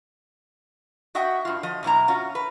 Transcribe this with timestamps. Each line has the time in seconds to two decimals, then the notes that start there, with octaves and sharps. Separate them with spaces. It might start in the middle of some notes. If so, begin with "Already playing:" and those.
1.15 F#4 D#5 E5 F#5 G5
1.45 G2 F4
1.63 F3 D#5
1.83 F#2 B2 E4 A#5
2.08 C#4 F4 F#4
2.35 B4